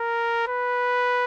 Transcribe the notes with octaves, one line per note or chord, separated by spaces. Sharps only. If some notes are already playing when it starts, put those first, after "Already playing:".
Already playing: A#4
B4